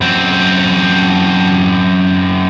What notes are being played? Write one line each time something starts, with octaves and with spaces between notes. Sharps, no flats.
F#2 C4